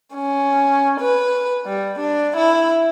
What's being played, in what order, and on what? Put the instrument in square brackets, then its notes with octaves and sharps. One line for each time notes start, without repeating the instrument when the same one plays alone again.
[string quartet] C#4
B4
G3
D4
E4